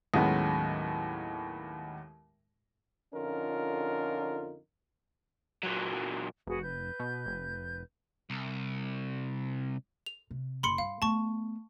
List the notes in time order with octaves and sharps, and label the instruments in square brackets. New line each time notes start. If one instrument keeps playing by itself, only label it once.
[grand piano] D#2 A2 F#3 G#3 B3 C#4
[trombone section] F2 D3 C#4 D#4 F4 A#4
[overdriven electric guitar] A#2 F#3
[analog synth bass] F1 [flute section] F#4 G#4 B4
[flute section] B4 G6
[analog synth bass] B2
F1
[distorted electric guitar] C2
[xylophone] F7
[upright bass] C3
[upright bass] F#1 [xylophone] B5 C6 C#7
[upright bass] G2 [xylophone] F5
[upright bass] A3 B3 [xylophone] A5 C#6